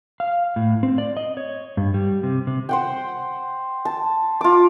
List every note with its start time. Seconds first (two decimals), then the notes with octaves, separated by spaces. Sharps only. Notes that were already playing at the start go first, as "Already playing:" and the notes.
0.20 F5
0.56 A2
0.83 C4
0.98 D5
1.17 D#5
1.37 C#5
1.77 G2
1.94 G3
2.23 C3
2.47 C3
2.69 C5 F#5 G5
3.85 A5
4.41 F4 D6